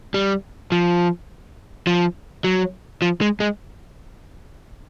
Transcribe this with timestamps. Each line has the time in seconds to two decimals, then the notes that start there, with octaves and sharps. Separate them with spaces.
0.14 G3
0.72 F3
1.87 F3
2.44 F#3
3.02 F3
3.21 G#3
3.40 G#3